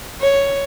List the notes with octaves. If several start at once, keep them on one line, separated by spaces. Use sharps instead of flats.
C#5